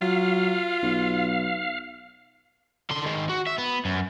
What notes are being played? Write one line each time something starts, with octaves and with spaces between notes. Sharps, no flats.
F#3 F4 F5
B1
D3 C6
D#3 G#3
F#4
E5
B3
F#2